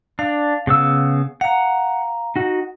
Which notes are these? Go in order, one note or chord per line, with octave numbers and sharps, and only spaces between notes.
D4 F5
C#3 B3 E6
F5 F#5 A#5
D#4 F#4